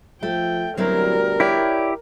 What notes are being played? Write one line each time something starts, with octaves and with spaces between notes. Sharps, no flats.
F3 A3 G5
D2 B2 F#3 G3 C4 E4 A#4
E4 G4 C#5 D5